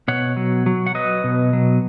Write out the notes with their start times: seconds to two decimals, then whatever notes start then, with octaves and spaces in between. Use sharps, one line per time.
0.08 B2 C#5 F#5
0.37 F#3
0.66 F#3
0.86 F#5
0.95 F#3 B4 D#5
1.24 B2
1.53 F#3